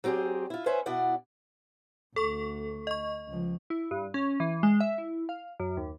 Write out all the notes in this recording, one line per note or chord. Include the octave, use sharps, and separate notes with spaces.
F#3 C4 G4 G#4 D5
E4 F4
C#4 B4 C5 E5 G#5
B2 E4 D5 F#5
D2 A4 C#6
D#5 C#6
C#2 F3
E4
G2
C#4
E3
G#3
E5
E4
F5
F#2
D#2